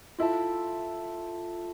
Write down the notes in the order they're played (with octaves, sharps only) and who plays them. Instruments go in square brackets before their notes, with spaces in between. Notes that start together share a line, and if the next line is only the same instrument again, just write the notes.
[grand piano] E4 [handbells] F4 A4 E5 A5